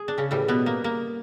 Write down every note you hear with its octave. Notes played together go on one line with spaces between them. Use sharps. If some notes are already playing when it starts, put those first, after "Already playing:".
Already playing: G#4
D4
C#3 C#4
A2 E3 G3
B2 B3
A#3
A#3